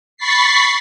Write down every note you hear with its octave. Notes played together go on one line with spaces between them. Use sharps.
B5 C#6 A6 B6 C7